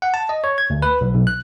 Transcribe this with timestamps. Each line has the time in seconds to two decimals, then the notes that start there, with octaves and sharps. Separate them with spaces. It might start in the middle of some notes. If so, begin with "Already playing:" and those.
0.02 F#5
0.14 A5
0.29 D#5
0.44 C#5
0.58 G#6
0.70 D2
0.82 B4
1.01 B1
1.15 B1
1.27 F#6